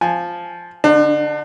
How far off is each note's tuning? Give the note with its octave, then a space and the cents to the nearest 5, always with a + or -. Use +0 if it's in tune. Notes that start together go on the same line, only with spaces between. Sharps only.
F3 +0 G#5 +0
D3 -15 D4 +40